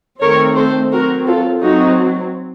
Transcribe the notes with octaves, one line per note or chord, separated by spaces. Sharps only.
D#3 A3 C4 A#4 C#5
A4 C5
F#3 C4 F#4 A#4
F4 A4
F#3 C4 D#4 F#4